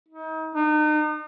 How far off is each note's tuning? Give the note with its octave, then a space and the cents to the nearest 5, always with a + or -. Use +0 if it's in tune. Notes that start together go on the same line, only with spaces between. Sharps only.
D#4 +40
D#4 -40